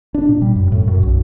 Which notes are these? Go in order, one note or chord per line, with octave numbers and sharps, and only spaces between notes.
D4
A#2
G3
F#2
A2
F#2
B1